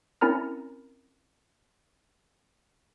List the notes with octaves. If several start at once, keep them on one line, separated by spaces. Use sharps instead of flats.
C4 C#4 E4 A#4 A#5 F6